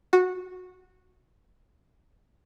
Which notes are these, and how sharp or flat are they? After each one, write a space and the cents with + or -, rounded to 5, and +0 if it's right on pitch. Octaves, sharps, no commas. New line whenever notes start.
F#4 -15